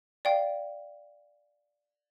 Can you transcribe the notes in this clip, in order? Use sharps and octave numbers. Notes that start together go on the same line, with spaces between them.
D5 F5 G5